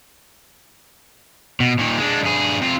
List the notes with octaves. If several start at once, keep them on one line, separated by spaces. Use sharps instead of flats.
B2
A#2 D#3
G#3 D4
G2 G#4
C3 F4